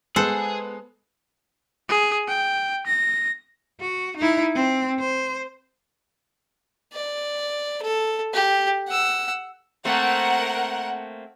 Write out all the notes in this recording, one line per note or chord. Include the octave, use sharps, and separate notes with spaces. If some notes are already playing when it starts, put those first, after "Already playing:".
G#3 B3 G#4 A4 C5 F#5
G#4
G5
A#6
F#4
D#4 E4
C4
C5
D5
A4
G4
F#5 E6
A3 A#3 C4 A#4 F#5